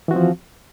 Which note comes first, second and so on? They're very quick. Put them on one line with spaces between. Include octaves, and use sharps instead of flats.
E3 F#4 C4 F3